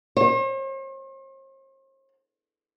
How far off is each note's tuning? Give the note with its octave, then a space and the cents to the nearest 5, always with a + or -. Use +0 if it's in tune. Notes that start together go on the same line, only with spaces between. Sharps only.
C5 +45